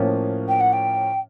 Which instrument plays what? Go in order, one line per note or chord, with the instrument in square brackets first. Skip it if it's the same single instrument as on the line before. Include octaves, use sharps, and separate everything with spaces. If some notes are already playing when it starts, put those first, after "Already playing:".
Already playing: [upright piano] A2 F3 A#3 C#4 F4
[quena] G5
F#5
G5